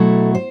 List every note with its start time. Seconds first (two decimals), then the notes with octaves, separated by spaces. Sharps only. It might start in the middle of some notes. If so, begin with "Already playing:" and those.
Already playing: B2 F#3 A3 E4 A4
0.35 C5